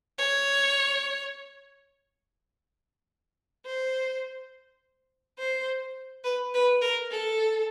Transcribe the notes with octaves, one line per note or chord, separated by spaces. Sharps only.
C#5
C5
C5
B4
B4
A#4
A4